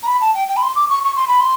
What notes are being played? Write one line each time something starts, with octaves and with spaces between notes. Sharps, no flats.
A#5
B5
A5
G5
G5
B5
C6
D6
C#6
C#6
C6
B5
C6